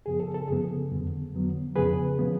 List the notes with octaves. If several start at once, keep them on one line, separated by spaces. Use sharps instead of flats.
F#2 C#3 F3 B3 G#4
A4
A4
F#2 C#3 F3 B3 G#4
F2 D3 F#3 B3
F2 D3 F#3 B3
F2 C#3 F3 B3 G#4 B4
C#3 F3 B3